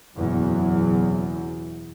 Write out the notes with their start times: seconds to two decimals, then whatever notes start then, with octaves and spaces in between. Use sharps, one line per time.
0.16 F#1 E2 B2 F#3